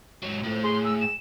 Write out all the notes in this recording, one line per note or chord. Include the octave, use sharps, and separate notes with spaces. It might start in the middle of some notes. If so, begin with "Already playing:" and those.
G#2 F#3
F2 A2
G#4 C6
E6
E7